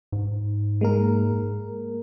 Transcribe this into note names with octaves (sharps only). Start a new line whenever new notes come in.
G#2
G#3 A#3 A#4